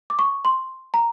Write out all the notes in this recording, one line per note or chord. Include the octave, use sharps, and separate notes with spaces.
D6
C#6
C6
A#5